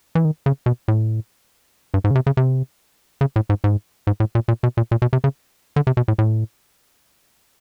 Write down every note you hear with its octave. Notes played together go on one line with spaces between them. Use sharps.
E3
D#3
C#3
B2
A2
G2
G#2
C#3
C3
C#3
C3
C#3
A2
G#2
G#2
G#2
A2
A#2
A#2
B2
A#2
A#2
B2
C3
C#3
D3
C3
B2
A2
A2